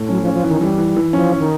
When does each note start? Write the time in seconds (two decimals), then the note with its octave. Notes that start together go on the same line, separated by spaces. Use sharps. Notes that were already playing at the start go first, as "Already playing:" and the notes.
Already playing: A2
0.09 F#3 C#4
0.22 F3
0.26 C#4
0.34 F3
0.43 E3
0.48 D#3
0.61 E3 G3
0.78 E3
0.96 E3
1.13 F3 C#4
1.31 C#4
1.40 D#3